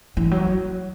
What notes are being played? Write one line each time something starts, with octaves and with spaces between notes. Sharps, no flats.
E3
F#3